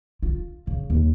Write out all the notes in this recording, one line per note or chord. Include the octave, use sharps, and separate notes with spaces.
F4
C#3
D#2